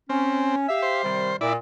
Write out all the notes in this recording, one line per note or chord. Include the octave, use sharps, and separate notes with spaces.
C4 C#4
G4 E5 F5
C5
C3 D#3 G3
A#2 E4 D5